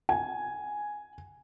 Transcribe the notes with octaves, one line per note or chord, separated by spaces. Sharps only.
G#5